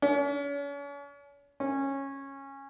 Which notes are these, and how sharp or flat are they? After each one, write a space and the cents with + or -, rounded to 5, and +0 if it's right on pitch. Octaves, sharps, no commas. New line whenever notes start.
C#4 +40
C#4 -15